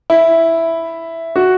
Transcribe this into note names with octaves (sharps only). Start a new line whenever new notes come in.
E4
F#4